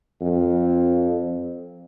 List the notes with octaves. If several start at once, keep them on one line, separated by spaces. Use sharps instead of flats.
F2